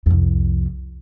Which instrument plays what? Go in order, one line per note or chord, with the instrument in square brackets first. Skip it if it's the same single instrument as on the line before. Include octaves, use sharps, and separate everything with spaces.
[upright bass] C2 F2